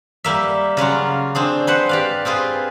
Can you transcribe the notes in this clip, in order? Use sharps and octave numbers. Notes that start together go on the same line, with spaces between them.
G3 A#3 E5
C#3 F#3 F4 F#4
C4 D4 G#4
B4 C5 F#5
G4 D5 F5
C4 F4 G#4 B4